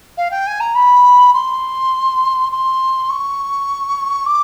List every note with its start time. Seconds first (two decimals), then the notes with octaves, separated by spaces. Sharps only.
0.17 F5
0.31 G5
0.47 G#5
0.60 A#5
0.75 B5
1.33 C6
2.51 C6
3.10 C#6
4.26 D6